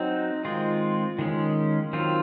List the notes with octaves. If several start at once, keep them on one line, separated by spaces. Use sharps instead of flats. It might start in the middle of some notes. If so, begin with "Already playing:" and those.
Already playing: F#3 C4 D#4
D#3 G#3 C4 F4
D#3 G#3 C#4
D#3 F#3 C4 F4